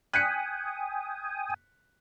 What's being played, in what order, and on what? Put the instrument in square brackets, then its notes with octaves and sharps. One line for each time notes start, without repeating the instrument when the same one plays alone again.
[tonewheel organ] G5 G#5 D#6 [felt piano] F#6 B6 C#7